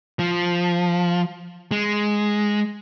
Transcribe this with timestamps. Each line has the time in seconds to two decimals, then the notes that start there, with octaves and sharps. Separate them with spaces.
0.19 F3
1.71 G#3